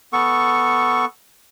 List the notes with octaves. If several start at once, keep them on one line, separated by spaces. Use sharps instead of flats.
B3 A4 C#6